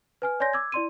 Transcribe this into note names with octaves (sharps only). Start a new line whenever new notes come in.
B4 G#5 F6
C#5 D5 G#5 C6 G6 A#6
D6 E6 G#6
E4 D5 C6 D#7